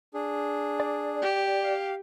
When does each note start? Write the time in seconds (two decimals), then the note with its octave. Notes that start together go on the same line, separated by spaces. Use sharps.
0.14 D4 G#4
0.80 D5
1.22 G4
1.64 F5